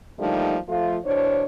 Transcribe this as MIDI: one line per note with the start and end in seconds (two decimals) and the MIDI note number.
0.18 0.56 50
0.18 0.56 53
0.18 0.56 55
0.18 0.56 57
0.18 0.56 58
0.18 0.56 63
0.68 0.97 53
0.68 0.97 57
0.68 0.97 65
1.05 1.44 40
1.05 1.44 47
1.05 1.44 62
1.05 1.44 72
1.05 1.44 73